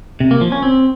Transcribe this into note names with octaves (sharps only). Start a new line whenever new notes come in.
C3
A#3
F3
C#4
C4